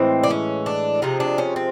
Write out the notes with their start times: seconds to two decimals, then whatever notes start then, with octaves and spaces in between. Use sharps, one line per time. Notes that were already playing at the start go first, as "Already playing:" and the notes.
Already playing: A2 E3 G#3 C4
0.24 D4
0.30 C#4
0.66 D4
1.02 C3 F3 G#3 D#4
1.20 D4
1.38 C#4
1.56 C4